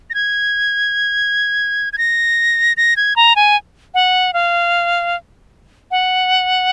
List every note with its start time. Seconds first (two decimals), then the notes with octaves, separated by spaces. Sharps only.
0.10 A#6
0.14 G#6
1.93 G#6
1.98 A#6
2.77 A#6
2.97 G#6
3.16 A#5
3.36 G#5
3.94 F#5
4.33 F5
5.91 F#5